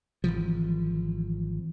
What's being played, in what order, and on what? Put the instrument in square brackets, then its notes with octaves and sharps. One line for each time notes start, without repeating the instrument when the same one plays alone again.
[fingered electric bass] G#1 C#3 E3 F3